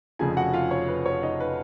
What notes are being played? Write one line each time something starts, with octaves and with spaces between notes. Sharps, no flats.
F1 F2 C#3 F3 G#4 G#5
F#4 F#5
F4 F5
C#5
B4
C#5
D#4 D#5
B4